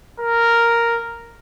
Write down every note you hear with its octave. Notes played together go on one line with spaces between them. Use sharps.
A#4